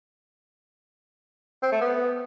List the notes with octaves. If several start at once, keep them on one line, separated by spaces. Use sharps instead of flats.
C4
A3
B3